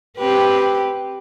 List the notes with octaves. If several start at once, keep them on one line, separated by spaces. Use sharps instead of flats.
C4 G4 B4